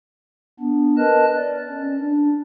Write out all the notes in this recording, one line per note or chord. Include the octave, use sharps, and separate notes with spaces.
B3 D4
A#4 B4 D#5 A5 F#6
D5
C#4
D4